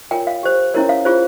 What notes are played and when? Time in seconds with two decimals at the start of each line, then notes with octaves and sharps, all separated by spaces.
0.11 F4 A#4 C#5 G5
0.27 F5
0.43 G4 C5
0.74 C#4 E4 A#4 C#5
0.89 F5
1.05 F4 G#4 C5